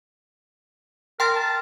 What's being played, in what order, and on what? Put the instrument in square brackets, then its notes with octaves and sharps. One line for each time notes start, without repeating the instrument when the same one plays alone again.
[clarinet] A#4 [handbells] G5 C6 A6
[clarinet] A5